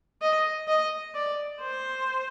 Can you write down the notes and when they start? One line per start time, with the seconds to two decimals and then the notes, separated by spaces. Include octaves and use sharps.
0.22 D#5
0.68 D#5
1.14 D5
1.61 C5